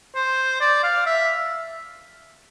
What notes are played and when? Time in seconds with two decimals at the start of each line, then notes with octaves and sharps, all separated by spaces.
0.15 C5
0.60 D5
0.83 F5
1.06 E5